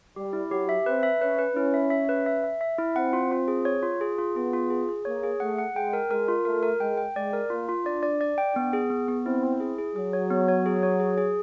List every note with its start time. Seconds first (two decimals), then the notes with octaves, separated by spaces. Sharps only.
0.16 G3 G4
0.33 E4
0.51 F#3 G4
0.69 E5
0.86 C4 B4
1.03 E5
1.20 C#4 B4
1.39 B4
1.56 C#4 E4
1.74 E5
1.90 E5
2.09 B4
2.26 E5
2.44 E5
2.61 E5
2.78 E4
2.96 C4 F#5
3.13 F4
3.31 F4
3.48 G#4
3.65 C#5
3.83 F4
4.01 G#4
4.19 F4
4.36 B3 G#4
4.53 F4
4.70 G#4
4.89 G#4
5.05 A#3 C#5
5.23 G#4
5.40 A3 F#5
5.59 F#5
5.75 G#3 G5
5.93 A#4
6.10 G#3 A#4
6.28 F4
6.45 A3 A#4
6.63 A#4
6.80 G#3 G5
6.98 G5
7.16 G#3 D5
7.33 A#4
7.50 A#3 F4
7.69 F4
7.86 D4 D5
8.03 D5
8.21 D5
8.38 G5
8.55 B3 D4
8.73 G#4
8.90 B3
9.08 B3
9.26 C4 E4
9.44 E4
9.60 G#4
9.78 G#4
9.95 F#3 G#4
10.13 C#5
10.30 B3
10.48 C#5
10.66 G#4
10.83 C#5
11.00 G#4
11.18 G#4